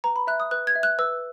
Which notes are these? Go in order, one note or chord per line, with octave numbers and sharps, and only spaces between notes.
B4 A#5
B5
E5 F#6
D#6
B4 F#6
G#6
E5
F#6
B4 E6